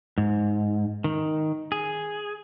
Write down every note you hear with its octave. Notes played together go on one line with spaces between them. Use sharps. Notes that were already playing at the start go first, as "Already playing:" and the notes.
G#2
D#3
G#4